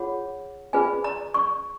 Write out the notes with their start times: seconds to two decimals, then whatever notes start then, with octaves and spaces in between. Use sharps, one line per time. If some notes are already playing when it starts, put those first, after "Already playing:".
Already playing: F4 G#4 C#5 F#5
0.73 F4 G#4 B4 G#5
1.04 A#5
1.34 C#6